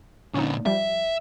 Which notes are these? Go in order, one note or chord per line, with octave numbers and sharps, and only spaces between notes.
A#2 D3 C#4 D#4
F3 G3 E5